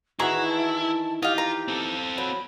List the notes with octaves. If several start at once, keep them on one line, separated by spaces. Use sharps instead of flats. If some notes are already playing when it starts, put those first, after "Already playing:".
D#3 E3 E4 F#4 G#4 A#5 C#6
A5
F4 G4 D#5 F5
A#5
C4 A4
F#3 B5